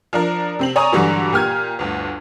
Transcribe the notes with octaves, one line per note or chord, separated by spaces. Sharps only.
F3 D4 A#4
C3 C4 F#7
C#5 D5 G#5 A#5 C#6 D#6
G2 D3 E3 F#3 G3
A#2 G4 F6 G#6
G1 D2